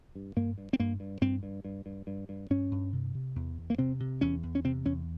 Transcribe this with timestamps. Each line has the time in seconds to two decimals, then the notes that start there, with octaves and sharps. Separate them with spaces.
0.15 G2
0.36 G2 A#3
0.58 G2
0.73 C4
0.79 G2 A#3
1.00 G2
1.21 G2 C4
1.43 G2
1.65 G2
1.86 G2
2.07 G2
2.29 G2
2.50 G2 C#4
2.71 G2
2.93 C3
3.14 C3
3.36 E2
3.58 E2
3.70 A#3
3.78 C3 C4
4.00 C3
4.21 E2 C#4
4.43 E2
4.55 C#4
4.64 C3 C4
4.85 E2 C#4